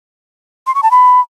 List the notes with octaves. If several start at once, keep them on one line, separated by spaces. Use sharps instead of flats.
C6
C#6
A5
B5